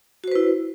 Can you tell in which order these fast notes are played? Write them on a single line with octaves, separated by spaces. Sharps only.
F#4 C5 B4 E4